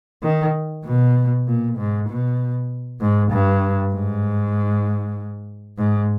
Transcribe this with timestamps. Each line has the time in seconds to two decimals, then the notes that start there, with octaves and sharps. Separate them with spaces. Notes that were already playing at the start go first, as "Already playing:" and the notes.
0.23 D#3
0.85 B2
1.47 A#2
1.78 G#2
2.09 B2
3.01 G#2
3.32 G2
3.93 G#2
5.78 G#2